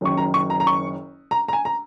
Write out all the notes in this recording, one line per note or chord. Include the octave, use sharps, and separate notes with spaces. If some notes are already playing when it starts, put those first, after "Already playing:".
F#1 F#2 D#3 C#6
A#5
C#6
A#5
A#5
C#6
A#5
A#5
G#5
A#5